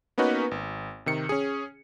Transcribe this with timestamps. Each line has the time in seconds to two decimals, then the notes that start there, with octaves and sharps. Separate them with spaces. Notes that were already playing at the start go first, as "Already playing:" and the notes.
0.18 A#3 B3 C#4 D#4 F#4 B4
0.51 G#1
1.06 C3 D#3 C#7
1.29 C#4 G#4